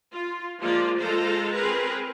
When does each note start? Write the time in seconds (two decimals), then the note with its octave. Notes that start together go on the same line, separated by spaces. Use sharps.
0.12 F4
0.60 F3 G#3 A#3 F4 D5
0.99 G#3 F4 A4 C5 A#5
1.55 C4 G#4 A#4 B4